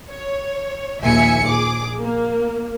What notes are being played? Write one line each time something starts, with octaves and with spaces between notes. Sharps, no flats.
C#5
A#1 D#2 E5 G#5 C#7
A#1 G#4 D6
A#3